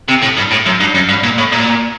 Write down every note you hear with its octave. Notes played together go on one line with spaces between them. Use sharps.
C3
A2
G2
A2
F#2
G2
F#2
G2
A#2
A2
A#2